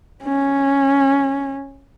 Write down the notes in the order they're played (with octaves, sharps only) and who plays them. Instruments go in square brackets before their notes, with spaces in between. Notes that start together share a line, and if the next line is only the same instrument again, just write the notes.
[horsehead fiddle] C#4